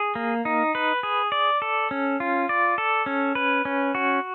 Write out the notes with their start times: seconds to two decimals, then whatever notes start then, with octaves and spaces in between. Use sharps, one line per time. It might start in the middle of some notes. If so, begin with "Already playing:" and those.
Already playing: G#4
0.15 A#3
0.45 D#4
0.75 B4
1.03 G#4
1.32 D5
1.62 A4
1.91 C#4
2.20 F4
2.49 D5
2.78 A4
3.06 C#4
3.35 B4
3.65 C#4
3.95 F#4